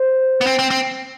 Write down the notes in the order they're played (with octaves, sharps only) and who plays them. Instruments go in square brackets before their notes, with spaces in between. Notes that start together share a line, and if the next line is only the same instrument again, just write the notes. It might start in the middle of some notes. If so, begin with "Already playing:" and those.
Already playing: [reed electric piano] C5
[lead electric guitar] B3
C4
C4
C4